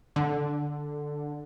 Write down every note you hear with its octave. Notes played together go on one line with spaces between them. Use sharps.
D3